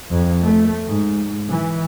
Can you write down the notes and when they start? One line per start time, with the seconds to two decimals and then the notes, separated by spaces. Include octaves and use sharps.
0.11 F2
0.43 A3
0.88 G#2
1.49 E3